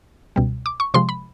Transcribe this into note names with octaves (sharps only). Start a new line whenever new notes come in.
C#2 B2 G3
D6
C#6
C3 F3 G#3 C6
B5